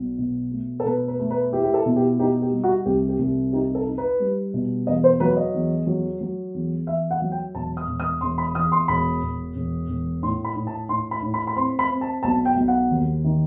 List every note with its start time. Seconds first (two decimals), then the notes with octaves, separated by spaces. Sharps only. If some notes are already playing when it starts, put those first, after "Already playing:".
Already playing: B1
0.18 B2
0.51 A3
0.80 A4
0.85 B2 B4
1.08 B4
1.19 A3
1.30 B4
1.53 E4 G4
1.64 G4
1.74 A4
1.86 B2
1.96 G4
2.19 D#4 G4
2.42 G4
2.52 G3
2.64 F#4
2.86 C2 G4
3.09 G4
3.19 C2
3.53 D#4 G4
3.75 A4
3.86 D#4
3.98 B4
4.20 G3
4.54 B2
4.87 E2 D#5
5.04 C5
5.20 F#3 B4
5.37 D#5
5.54 E2
5.87 F#3
6.21 F#3
6.54 E2
6.87 E2 E5
7.11 F#5
7.22 F#3
7.32 G5
7.54 E1 A5
7.77 D#6
7.88 E1
8.00 D#6
8.21 E1 C6
8.38 B5
8.55 E2 D#6
8.72 C6
8.88 E1 B5
9.23 E1
9.56 E1
9.89 E1
10.22 A2 C6
10.45 B5
10.56 A2
10.67 A5
10.89 A2 C6
11.11 B5
11.22 A2
11.34 B5
11.47 B5
11.56 C4 C6
11.79 B5
11.90 C4
12.01 A5
12.23 B1 A5
12.45 G5
12.57 B1
12.68 F#5
12.90 D#2
13.24 D#3